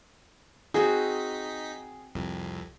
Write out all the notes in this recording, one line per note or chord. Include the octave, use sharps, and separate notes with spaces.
C4 D#4 F#4 G#4 B6
C2 F2